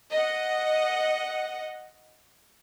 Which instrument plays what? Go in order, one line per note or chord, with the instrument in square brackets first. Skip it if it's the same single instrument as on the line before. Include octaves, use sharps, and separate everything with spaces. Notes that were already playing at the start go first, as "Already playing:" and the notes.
[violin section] D#5 F#5